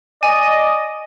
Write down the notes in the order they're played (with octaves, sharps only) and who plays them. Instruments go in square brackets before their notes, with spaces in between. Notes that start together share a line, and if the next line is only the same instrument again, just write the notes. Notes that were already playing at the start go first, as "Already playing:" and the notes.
[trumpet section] D5 D#5 [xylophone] G#5